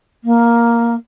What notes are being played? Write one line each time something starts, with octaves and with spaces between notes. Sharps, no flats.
A#3